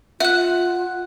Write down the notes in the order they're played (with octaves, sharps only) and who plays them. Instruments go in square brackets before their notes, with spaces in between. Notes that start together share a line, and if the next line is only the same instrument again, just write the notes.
[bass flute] F4 [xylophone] E5 F#6 [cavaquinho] F#5